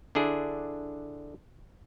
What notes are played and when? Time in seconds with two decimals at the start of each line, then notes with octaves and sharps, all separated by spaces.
0.15 D3 D4 E4 G#4